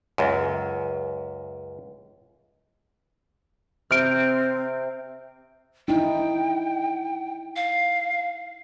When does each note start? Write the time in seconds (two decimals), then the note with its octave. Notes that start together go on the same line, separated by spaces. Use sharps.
0.18 C#2 F#2
3.91 C3 C4 F6 D7
5.88 D#4 E4 G5
7.56 F5